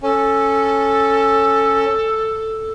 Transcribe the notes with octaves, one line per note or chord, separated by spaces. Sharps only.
C#4 A4